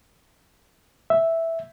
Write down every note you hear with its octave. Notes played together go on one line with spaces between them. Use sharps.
E5